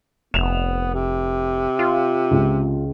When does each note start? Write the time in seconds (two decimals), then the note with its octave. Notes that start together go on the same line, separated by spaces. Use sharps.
0.34 F1 B3 E7 F7
0.94 C3
1.79 F4
2.31 C#2